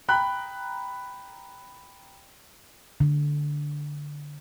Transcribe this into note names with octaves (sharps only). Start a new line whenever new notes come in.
G5 A#5 B5 F#6
D3